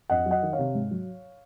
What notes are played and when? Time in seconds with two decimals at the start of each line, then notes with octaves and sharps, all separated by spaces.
0.10 F2 D#5 F#5
0.26 F#3
0.31 D#5 F#5
0.42 D#3
0.53 C#5 F5
0.59 C3
0.75 G#2
0.91 F#3